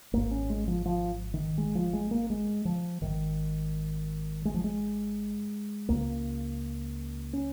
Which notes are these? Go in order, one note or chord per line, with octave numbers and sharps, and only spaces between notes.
G#1 G#2 A#3
C#4
G#3
F3
F3
D#3
G#3
F3
G#3
A#3
G#3
F3
G#1 G#2 D#3
G#3
F3
G#3
C#2 C#3 A#3
C#4